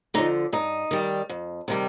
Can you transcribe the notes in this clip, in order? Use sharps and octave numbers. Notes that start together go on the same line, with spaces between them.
D3 F3 D#4
G2 D#4
D#3 G3
F2
C3 D#3 G3